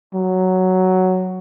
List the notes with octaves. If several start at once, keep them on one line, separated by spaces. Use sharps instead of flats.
F#3